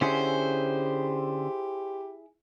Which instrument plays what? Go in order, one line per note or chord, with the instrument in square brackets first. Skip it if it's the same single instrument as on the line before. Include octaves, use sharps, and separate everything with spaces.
[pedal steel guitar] D3 C#4 F#5 [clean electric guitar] E4 G#4 [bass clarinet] G4 [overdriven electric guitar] C5